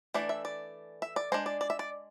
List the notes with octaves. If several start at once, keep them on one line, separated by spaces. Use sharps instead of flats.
E3 A3 D4 D5
E5
D5
E5
D5
G#3 D4 C5
D5
D5
E5
D5